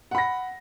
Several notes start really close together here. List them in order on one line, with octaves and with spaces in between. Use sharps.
F#5 B5 A#6